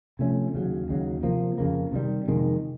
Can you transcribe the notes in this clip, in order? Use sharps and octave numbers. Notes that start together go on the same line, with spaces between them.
C3 F3 A3 C#4
D#2 C#3 F#3
D#2 C#3 F#3
C3 F3 A#3
F2 C#3 F3 A#3
C3 D#3 G3
F2 C3 D#3 G#3